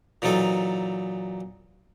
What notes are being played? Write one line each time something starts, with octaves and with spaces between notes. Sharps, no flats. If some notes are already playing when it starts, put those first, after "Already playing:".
A#2 E3 F#3 D#4 A4